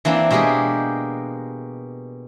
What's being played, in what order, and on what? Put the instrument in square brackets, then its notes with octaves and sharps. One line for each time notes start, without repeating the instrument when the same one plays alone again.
[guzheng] E3 A#3 C4 D4
B2 G#3 A#3 G4 G#4